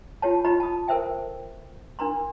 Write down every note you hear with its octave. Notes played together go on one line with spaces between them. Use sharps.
F4 G4 C#5 A5
F4 G4 D#5 A#5 B5
A5 D#6
A4 A#4 C5 E5 G5
D4 A#4 A#5 C6